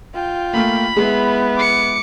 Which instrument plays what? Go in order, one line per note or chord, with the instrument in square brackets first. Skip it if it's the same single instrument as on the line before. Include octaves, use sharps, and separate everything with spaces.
[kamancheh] F4 G5
[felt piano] A3 A#3 [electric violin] B5
[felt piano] G#3 [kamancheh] B3 E4
[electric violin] D6 C#7